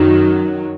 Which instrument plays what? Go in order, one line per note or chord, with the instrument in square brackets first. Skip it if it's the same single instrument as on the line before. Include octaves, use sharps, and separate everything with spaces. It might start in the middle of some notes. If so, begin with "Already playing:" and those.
Already playing: [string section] F#2 D#3 F#3